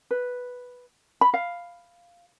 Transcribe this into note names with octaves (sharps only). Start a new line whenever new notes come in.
B4
B5
F5